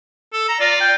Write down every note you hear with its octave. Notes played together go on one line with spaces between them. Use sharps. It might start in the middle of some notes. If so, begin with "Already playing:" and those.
A4
A#5
F4 D5
G5